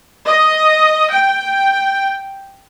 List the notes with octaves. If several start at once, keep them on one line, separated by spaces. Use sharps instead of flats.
D#5
G5